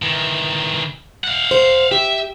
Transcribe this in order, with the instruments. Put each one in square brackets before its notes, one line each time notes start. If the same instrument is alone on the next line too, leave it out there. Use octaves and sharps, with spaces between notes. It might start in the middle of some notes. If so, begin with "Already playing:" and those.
[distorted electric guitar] D#3 E3
F5 F#5
[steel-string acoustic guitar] C5
[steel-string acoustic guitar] G4 [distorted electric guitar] E5